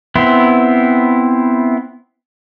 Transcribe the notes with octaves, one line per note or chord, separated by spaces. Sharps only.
B3 C4 E4